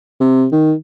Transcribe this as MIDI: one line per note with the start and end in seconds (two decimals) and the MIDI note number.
0.20 0.46 48
0.52 0.73 51